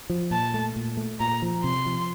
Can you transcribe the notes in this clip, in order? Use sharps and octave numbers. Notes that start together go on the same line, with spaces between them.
F3
A#2 A5
A3
A#2
A3
A#2 A#5
F3
C3 C6
F3